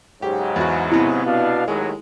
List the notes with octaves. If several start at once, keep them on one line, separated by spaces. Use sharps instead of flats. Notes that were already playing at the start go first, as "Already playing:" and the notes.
G#2 C#3 F#3 G4
E2 F#4
C3 B3 E4
B2 D4 F5
D#2 A2 F#3 G#3